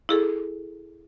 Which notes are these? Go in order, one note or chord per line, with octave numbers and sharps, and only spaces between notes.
E4 G#4 A4